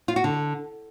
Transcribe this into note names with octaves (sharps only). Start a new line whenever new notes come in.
F4
F#4
D3